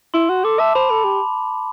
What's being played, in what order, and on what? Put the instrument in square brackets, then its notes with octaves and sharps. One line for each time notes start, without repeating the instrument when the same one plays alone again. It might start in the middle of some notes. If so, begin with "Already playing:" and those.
[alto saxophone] E4 [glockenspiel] C6
[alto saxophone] F#4
[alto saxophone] A4 [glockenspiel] D6
[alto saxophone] E5 [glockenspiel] A5
[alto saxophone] C5 [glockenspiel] B5
[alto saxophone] A4 [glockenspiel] B5
[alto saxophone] G4